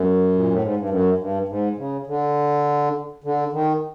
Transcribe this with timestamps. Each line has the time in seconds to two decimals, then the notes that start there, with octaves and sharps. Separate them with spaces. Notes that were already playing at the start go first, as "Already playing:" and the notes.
Already playing: F#2
0.35 A#2
0.49 A2
0.62 G#2
0.76 G2
0.89 F#2
1.18 G2
1.48 G#2
1.77 C#3
2.07 D3
3.24 D3
3.52 D#3